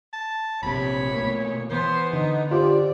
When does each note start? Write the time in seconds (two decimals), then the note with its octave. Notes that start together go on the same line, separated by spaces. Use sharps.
0.13 A5
0.63 A#1 C3 C#5 B5
1.13 B2 A3 A#3
1.71 E3 B3 C5
2.13 D3 D#4
2.51 F4 G4 C5 D5